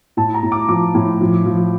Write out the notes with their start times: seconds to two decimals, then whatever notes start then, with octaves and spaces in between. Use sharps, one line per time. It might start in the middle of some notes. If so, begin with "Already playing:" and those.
0.17 A2 A5
0.34 A#5
0.43 A2
0.52 D6
0.69 F3 D6
0.95 A2
1.21 F3
1.46 F3